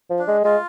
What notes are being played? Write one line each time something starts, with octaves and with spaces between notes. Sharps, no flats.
F3
D4
G#3
G#3 F4